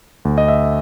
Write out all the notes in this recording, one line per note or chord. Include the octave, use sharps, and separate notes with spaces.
D2
D#5
E5